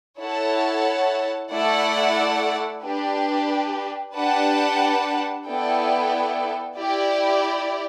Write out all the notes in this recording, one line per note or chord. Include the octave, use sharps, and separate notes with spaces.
E4 A4 C#5 F#5 A5
A3 E4 A4 D5 F#5
D4 G4 B4
D4 G4 B4 F#5 A5
B3 E4 A4 D5 G5
E4 G4 D5